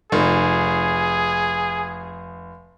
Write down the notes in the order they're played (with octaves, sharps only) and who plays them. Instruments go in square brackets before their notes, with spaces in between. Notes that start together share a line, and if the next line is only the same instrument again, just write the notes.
[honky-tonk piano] F1 [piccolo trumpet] G#4